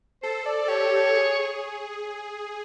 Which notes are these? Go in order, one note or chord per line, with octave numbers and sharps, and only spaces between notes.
A4 C5
D5
G4 C#5
G#4